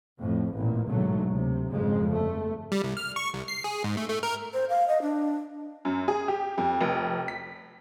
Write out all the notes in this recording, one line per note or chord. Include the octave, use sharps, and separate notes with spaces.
F2 A2
A1 E2 A#2
B1 G#2 D3 F#3 A3
D2 C3
G#1 F2 C#3 G#3
G1 A3
G3
C2
F6
C#6
C2
C7
G#4
G#2
A3
A3
A#4
C5
F5
D#5
D4
F#2
G#4
G4
F2
F1
B6